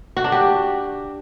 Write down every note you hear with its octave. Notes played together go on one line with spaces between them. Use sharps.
F#4
D4
G4